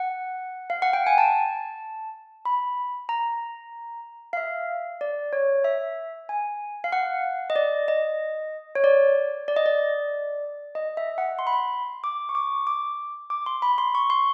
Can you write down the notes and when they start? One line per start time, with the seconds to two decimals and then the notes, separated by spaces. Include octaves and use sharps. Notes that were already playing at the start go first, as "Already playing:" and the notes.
Already playing: F#5
0.70 F5
0.82 F#5
0.93 G5
1.07 G#5
1.18 A5
2.45 B5
3.09 A#5
4.33 F5
4.37 E5
5.01 D5
5.33 C#5
5.64 E5
6.29 G#5
6.84 F5
6.92 F#5
7.50 D#5
7.56 D5
7.88 D#5
8.75 C#5
8.84 D5
9.48 D5
9.56 D#5
9.66 D5
10.75 D#5
10.97 E5
11.18 F#5
11.39 C6
11.47 B5
11.53 C6
12.04 D6
12.29 C#6
12.35 D6
12.67 D6
13.30 D6
13.46 C6
13.62 B5
13.78 C6
13.95 C#6
14.10 C6